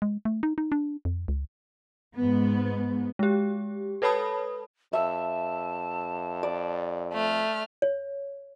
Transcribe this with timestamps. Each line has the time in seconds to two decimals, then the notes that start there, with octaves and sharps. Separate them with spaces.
0.02 G#3
0.25 A3
0.43 D#4
0.58 D#4
0.72 D4
1.05 F2
1.28 C#2
2.16 G#2 B3
3.19 G#3 G4
4.02 A4 B4 C#5 A5 B5 D#6
4.93 F2 E5 A5
6.43 D5
7.13 A3 F6
7.82 C#5